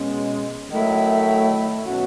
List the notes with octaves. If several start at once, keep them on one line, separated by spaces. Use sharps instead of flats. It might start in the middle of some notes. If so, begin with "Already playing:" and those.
Already playing: B2 G#3 C#4
D#3 F#3 A3 E4
B2 F#3 C#4 F#4